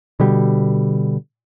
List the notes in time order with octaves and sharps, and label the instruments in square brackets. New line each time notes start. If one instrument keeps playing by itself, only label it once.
[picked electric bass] B2 D3 G3